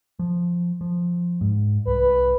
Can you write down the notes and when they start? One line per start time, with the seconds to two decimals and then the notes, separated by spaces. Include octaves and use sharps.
0.19 F3
0.81 F3
1.41 G#2
1.87 C2 B4